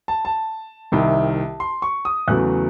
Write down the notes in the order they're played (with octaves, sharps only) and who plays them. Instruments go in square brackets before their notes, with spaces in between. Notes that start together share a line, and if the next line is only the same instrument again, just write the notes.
[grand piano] A5
A5
C2 C3 D#3
C6
C#6
D#6
E2 C#3 F#3 A3 F#6